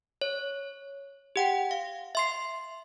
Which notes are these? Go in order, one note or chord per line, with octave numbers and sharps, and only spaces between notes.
C#5
G4 F#5 G5
F5
E5 C6 C7